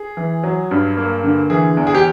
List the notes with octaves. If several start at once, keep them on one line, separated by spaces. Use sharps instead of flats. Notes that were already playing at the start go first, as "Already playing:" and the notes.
Already playing: G#4
E3
F#3
G2
A#3
D3
E3 G#4
E2
G#4
G4